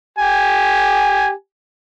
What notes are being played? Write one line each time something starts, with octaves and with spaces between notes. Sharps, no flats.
G4 G#5